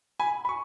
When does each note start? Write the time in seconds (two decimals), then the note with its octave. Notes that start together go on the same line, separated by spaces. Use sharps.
0.20 G#5 B5
0.45 B5
0.49 C#6